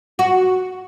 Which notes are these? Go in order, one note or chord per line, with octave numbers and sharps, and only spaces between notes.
F#4